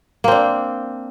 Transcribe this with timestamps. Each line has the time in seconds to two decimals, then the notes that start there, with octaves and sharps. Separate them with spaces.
0.24 A#3
0.28 C4
0.32 D4